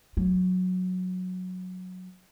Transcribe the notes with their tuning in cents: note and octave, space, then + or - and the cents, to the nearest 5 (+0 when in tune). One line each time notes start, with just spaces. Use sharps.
F#3 -10